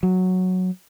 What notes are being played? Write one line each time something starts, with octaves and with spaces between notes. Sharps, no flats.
F#3